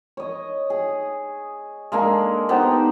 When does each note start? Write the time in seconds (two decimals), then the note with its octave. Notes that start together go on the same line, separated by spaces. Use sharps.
0.17 C#5 D#5
0.70 G#4
1.92 G#3 A#3 D4 A4
2.49 B3 D#4 G4 C5